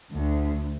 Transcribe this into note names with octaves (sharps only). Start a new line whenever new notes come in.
D2